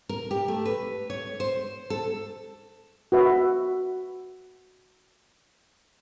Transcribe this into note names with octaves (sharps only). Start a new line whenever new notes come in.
A#4
G4
A3
B4
C#5
C5
A4
F#4 B4 E5